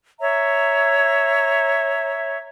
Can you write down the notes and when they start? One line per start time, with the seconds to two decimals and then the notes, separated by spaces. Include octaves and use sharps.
0.20 C#5 E5 A#5